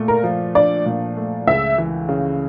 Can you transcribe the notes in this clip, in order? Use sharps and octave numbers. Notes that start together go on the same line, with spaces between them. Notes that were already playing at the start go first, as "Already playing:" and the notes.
Already playing: A#2 A3
A#4
F3
D4 D5
A#2
A3
C#2 E5
E3
C#3